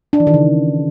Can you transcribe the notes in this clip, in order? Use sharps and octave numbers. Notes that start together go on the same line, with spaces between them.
D4
E3
D#3
C#3